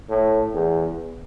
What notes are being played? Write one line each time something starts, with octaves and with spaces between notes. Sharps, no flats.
A2
E2